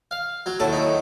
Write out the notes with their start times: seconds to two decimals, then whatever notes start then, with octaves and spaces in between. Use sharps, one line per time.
0.11 F5
0.46 F#3
0.60 D#2 F#3 A3 E4 F#4 A4
0.73 D#4